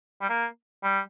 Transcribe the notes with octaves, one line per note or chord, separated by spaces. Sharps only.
G3
A#3
G3